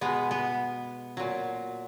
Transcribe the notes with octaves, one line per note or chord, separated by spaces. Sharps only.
B2 G#3 B3
B3
A#2 F#3